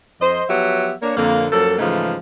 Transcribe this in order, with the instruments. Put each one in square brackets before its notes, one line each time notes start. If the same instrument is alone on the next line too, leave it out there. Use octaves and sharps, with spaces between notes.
[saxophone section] F2 C5 D#5
F3 F#3 B3 G4 E5 F#5
A#3 D4 C#5
F2 D3 A#3
F#2 F3 F#3 A#3 A4
G#2 C#3 E3 F3 G#3 A3